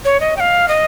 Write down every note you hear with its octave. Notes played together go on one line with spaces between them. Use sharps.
C#5
D#5
G5
F5
D#5